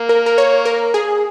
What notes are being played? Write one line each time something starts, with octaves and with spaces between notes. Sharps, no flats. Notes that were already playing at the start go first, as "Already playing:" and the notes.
Already playing: A#3
A#4
A#4
C#5
A#4
G#4